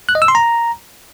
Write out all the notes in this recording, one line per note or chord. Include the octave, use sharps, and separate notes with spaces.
F#6
D#5
E6
C6
A#5